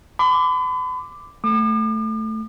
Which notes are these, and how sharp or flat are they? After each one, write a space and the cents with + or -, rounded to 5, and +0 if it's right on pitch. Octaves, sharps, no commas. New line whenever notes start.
B5 +40 D6 +0
A3 +0 D6 +45